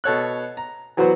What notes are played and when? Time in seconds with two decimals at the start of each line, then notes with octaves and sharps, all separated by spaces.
0.04 B2 A4 C#5 F#6
0.57 A#5
0.97 E3 F#3 B3 F#4 C5